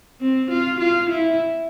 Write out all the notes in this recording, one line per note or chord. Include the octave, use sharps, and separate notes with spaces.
C4
F4
F4
E4